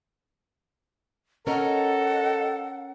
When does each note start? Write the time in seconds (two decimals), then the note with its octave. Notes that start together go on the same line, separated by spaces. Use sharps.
1.47 C#4 A4 A#4 D#5 F#5